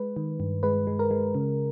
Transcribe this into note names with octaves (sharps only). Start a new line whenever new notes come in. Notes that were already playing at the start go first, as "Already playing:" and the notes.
Already playing: G#3 B4
D#3
G2
G#3 B4
G#3
A#4
G#3
C#3